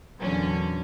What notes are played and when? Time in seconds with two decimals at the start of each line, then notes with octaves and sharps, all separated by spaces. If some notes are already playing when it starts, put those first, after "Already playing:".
0.20 E2 A#2 D3 F#3 C#4